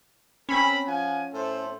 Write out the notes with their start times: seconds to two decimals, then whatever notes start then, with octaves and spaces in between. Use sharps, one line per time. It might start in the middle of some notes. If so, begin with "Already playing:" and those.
0.49 C4 C#4 A#4 B5
0.85 F3 F#5 G#5
1.33 A2 A4 C5